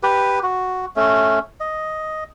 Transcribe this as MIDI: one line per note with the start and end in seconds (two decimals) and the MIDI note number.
0.03 0.39 67
0.03 0.39 71
0.43 0.86 66
0.96 1.39 57
0.96 1.39 61
1.60 2.24 75